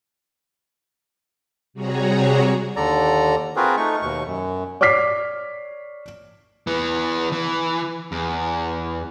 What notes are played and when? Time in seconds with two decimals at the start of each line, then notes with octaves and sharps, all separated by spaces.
1.73 C3 G3 F#4 G#4 C#5 A#5
2.76 D#2 D3 A4 D5 A#5
3.56 C4 F4 F#4 G#4 A#4 B4
3.77 A3 D#4 C#6
4.02 D#2 B2 C#6
4.25 F#2
4.81 C#5 D5 D6 F6 B6 C7
6.67 E3 B3
7.32 E3
8.12 E2